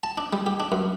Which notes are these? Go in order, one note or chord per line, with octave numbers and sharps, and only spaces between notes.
A5
D4
G3
G4
D4
F#2